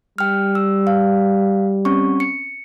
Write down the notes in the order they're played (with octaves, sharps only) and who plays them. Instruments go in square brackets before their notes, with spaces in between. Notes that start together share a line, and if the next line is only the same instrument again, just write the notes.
[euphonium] G3 [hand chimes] G5 F6
[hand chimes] E6
F5
C4 C#4 C#6
C#7